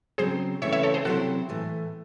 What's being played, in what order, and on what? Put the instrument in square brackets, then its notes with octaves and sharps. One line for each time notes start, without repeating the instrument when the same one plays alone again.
[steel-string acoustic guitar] C#3 F#3 C4 [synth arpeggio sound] G#4 C5
[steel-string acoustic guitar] C#3 E3 A3 C4 E4 [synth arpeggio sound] C#5 E5
[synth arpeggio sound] C#5 E5
A4 C#5
G#4 C5
[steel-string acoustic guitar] C3 F#3 C4 E4 C5 [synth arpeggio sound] F#4 A4
[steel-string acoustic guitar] A2 E3 A3